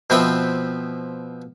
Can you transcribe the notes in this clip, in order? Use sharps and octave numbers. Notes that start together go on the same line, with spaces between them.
B2 F3 C4 B4 E5 G5